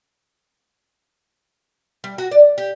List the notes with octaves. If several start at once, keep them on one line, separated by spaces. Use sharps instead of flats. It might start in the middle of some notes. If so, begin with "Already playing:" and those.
G3
F#4
D5
G4